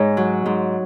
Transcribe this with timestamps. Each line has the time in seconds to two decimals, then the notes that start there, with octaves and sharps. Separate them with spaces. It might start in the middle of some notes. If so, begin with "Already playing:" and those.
Already playing: G#2 C#5 D#5
0.17 F#3
0.46 G#2